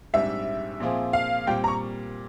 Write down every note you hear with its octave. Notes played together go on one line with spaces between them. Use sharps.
A#1 G#2 G3 C4 E5
A#2 F3 C4 F4 G#4
F5
A#2 G3 C4 G5
A#5
C#6